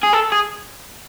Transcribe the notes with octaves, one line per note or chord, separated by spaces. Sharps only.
G#4
A4
G#4